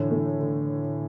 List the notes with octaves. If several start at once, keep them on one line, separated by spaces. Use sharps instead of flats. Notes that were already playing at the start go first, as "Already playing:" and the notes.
Already playing: A2 D3 E3
A3
D3